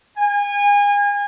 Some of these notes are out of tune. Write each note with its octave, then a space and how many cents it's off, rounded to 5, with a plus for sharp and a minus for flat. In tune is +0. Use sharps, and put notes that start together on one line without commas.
G#5 -30